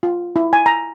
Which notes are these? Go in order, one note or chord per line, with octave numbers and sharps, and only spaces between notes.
F4
E4
G#5
A#5